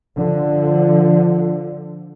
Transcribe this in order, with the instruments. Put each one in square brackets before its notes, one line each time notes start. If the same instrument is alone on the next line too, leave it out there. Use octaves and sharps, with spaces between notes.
[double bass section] D3 F3